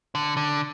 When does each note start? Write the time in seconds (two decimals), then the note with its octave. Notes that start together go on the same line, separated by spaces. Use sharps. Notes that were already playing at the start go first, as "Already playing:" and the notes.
0.15 D3
0.37 D3